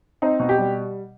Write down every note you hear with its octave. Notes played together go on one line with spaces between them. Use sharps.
C4 D#4
B2
G4
G3